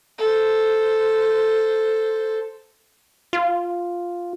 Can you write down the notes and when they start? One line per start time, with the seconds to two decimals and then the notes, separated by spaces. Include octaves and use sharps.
0.19 A4 C5
3.33 F4